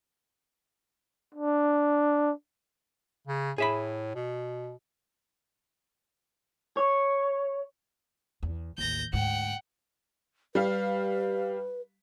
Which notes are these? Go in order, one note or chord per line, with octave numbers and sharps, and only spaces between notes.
D4
C#3
A2 G#4 E5 B5
B2
C#5
E2
A1 D#2 G6 A#6
D2 G#2 F#5 G5
G3 B4 F5